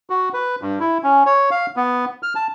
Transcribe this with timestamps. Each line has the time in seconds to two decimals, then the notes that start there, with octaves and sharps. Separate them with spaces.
0.10 F#4
0.34 B4
0.62 G2
0.80 E4
1.03 C#4
1.26 C#5
1.51 F5
1.76 B3
2.23 F6
2.35 A5